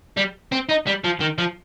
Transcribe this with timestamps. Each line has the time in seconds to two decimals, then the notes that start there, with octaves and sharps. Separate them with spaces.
0.17 G3
0.52 C4
0.69 D#4
0.87 G3
1.04 F3
1.20 D#3
1.38 F3